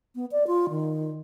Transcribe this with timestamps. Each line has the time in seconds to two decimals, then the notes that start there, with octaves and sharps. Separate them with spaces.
0.15 B3
0.32 D5
0.47 F4
0.70 D#3